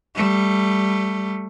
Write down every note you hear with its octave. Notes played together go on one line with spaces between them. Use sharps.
G3 A3